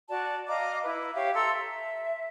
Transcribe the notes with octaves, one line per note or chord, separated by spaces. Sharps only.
F#4 D5 A5
D#5 F5 A#5 D6
E4 B4
G4 C#5 E5 F5
A4 A#5 C6 E6
E5